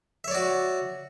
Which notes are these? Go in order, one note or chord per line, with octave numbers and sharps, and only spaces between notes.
F#4 C#5 D5 E5